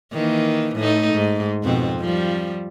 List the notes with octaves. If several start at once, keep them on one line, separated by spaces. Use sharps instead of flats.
D#3 E3 A#3
A2 A3 D#4
G#2
F2 B2 C4
F3 G3